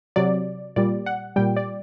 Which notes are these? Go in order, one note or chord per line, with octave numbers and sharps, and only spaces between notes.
C3 F#3 D5
A#2 G3 D5
F#5
A#2 G3 G5
D5